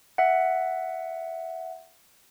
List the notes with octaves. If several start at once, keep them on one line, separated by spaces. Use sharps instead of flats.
E5 F#5